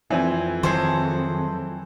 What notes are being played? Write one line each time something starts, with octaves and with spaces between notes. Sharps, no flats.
F2 E3 C4 G#5
D#3 F#3 G#4 A4 C5